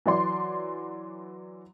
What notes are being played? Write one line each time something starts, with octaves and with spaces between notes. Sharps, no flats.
E3 F#3 D5 C6